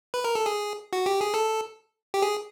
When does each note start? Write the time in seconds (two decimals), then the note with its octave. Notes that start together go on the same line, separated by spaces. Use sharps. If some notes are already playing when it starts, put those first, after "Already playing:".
0.14 B4
0.24 A#4
0.35 A4
0.46 G#4
0.93 F#4
1.06 G4
1.21 G#4
1.34 A4
2.14 G4
2.22 G#4